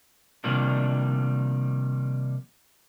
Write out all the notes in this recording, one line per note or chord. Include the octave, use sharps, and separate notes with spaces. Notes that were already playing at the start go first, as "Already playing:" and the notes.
C3 D#3 F3 G3 A#3 D4